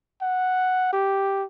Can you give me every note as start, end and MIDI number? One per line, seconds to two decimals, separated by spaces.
0.22 0.91 78
0.93 1.44 67